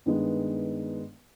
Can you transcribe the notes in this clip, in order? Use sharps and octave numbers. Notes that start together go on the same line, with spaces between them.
G2 D#3 G#3 B3